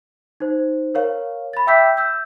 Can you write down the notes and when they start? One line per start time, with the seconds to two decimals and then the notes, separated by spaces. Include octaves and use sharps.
0.40 D#4 C5
0.94 A#4 C#5 F5
1.53 B5 A6
1.67 E5 G5 D6 E6 G6 B6
1.97 E6 G6